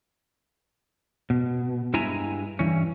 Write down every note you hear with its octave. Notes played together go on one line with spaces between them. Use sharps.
B2
G2 G#3 E4 E5 G#5 A#5
G2 E3 C#4